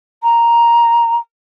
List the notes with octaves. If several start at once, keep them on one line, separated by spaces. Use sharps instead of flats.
A#5